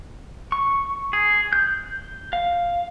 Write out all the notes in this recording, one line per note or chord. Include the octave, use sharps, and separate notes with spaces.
C#6
G#4
G6
F5